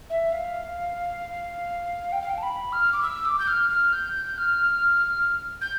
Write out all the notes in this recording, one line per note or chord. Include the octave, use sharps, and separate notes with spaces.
E5
F5
G5
F5
G5
A5
B5
F6
D6
E6
D6
G6
F6
F6
G6
F6
G6